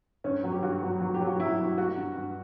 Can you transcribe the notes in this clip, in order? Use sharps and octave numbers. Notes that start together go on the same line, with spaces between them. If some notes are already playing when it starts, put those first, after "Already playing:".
G2 C#4
F#3
G4
G2 F#4
F#3
F#3
G4
F#3
F#4
F#3 E4
F#3
G3 F#4
G2
G2